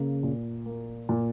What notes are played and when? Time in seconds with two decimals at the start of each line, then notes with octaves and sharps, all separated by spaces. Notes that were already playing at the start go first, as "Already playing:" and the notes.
Already playing: C#3 A#3
0.23 A#2
0.66 A#3
1.09 A#2